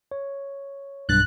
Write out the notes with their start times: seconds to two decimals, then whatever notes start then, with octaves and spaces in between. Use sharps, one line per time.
0.11 C#5
1.09 B1 G2 F#6 A6